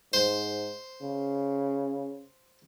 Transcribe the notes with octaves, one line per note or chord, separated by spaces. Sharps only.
G#2 C5
C#3